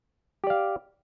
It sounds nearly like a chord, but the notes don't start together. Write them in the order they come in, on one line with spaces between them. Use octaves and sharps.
G4 D5 F5